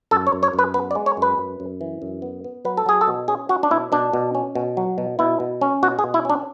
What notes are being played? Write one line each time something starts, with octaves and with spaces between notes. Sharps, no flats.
F#2 A4
C#5
F#2
C#5
F#2
B4
B3 B4
D5
G#3
C#5
F#2 B4
F#2
F#2
E3
F#2
B3
B3
F#3 B4
A4
F#3 G#4
A4
B2
C#4 G#4
C#4 F#4
D4
B2 E4
B2 D4
B2
C#4
B2
F#3
B2
B2 E4
B2
C#4
B2 F#4
G#4
B2
E4
C#4 D4